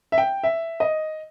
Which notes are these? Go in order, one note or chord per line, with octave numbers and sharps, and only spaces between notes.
E5
G5
E5
D#5